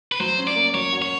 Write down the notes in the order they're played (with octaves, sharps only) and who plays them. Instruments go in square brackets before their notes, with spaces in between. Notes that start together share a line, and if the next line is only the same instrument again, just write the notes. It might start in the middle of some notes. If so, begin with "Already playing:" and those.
[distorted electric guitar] B4
[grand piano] F#3 [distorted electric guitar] C5
[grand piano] C#4
[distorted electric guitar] D5
[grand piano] A#3
[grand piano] F#3 [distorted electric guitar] C#5
[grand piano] F#4
[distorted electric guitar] C#5